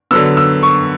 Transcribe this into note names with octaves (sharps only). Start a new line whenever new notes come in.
D3 F#3 B3 E6
E6
C#6